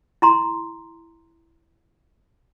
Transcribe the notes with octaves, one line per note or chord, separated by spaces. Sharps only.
E4 A#5 C6